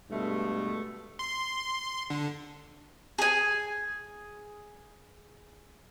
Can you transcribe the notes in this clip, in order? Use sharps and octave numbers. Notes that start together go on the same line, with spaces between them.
G2 B2 G#3 A3
C6
D3
G#4 G#5